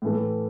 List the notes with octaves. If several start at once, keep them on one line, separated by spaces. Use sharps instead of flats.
A2 E3 A3